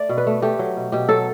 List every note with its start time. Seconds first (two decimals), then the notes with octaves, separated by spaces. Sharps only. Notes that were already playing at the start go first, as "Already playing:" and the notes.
Already playing: A3 D5
0.09 B2
0.18 B4
0.27 A3
0.42 A3 G4
0.59 F#3
0.77 B2
0.92 B2 G4
1.09 F#3 A4